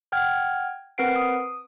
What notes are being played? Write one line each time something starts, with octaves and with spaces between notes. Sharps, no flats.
F#5 G5 F6 G#6
C4 A#4 B4 F#5 C7 D7
D#6